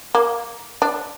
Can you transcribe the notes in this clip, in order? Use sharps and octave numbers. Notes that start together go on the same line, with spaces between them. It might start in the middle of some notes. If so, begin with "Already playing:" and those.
A#3
D4